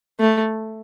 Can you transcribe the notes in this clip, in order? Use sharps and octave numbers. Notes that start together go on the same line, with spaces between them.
A3